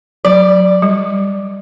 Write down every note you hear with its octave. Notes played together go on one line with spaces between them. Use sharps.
F#3 D5
G3